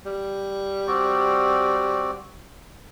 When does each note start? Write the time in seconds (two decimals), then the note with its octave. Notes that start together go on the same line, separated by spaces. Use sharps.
0.06 G3
0.87 C4 F#4 D5